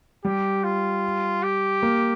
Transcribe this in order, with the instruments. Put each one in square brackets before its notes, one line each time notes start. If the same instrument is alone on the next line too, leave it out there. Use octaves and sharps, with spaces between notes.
[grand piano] G3 [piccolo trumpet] G4
[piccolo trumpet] F4
G4
[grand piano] A#3